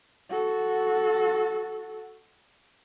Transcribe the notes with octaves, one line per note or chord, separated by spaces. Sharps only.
F#4 A4